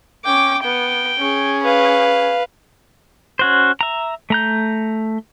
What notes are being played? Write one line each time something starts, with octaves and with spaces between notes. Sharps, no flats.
C#4 G5 D6
B3 G5
C#4 G#4
B4 F5
C#4 F#4 C5
E5 A#5
A3 A#5 G6